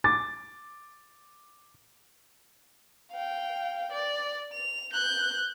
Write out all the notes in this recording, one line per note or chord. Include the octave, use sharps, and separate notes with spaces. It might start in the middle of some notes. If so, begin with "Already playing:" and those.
D6 A6
F5 G5
D5
F7
F#6 G6